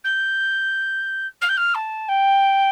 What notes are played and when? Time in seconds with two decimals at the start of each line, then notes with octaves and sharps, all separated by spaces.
0.04 G6
1.41 F6
1.49 G6
1.57 F6
1.74 A5
2.08 G5